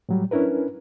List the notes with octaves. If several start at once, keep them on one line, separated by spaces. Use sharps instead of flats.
A2 F#3 G3
C#4 D4 E4 A#4 B4